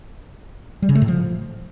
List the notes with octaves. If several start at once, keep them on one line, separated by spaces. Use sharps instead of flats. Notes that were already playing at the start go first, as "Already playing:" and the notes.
G3
C#3
A3
A2
F3